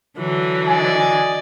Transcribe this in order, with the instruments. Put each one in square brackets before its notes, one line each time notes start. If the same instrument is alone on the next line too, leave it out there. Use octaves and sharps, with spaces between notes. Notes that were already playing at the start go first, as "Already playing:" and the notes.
[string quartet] D3 E3 F#3
[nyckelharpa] D5 D#5 [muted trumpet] G#5